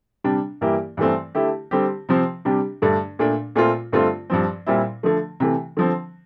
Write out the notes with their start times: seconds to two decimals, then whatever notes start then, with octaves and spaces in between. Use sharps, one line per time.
0.24 C3 G3 D4
0.61 G2 E3 A#3 E4 G4
0.97 G2 E3 A3 C4
1.35 D3 A3 E4 G4
1.71 D3 G3 C4 G4
2.09 C3 F3 C4
2.45 C3 G3 D4 G4
2.82 G2 D3 A3 D4
3.19 A#2 A3 D4
3.56 A#2 A3 C4 F4
3.92 G2 D3 A3 C4 F4
4.30 G2 F3 C4
4.66 A#2 G3 C4 E4
5.03 D3 F3 A3
5.40 C3 E3 A3
5.77 D3 F3 C4